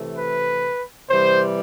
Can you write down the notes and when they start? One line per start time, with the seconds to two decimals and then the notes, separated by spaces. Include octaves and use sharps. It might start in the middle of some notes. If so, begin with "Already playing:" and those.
Already playing: C3 E3 A3
0.17 B4
1.09 C3 E3 G3 C5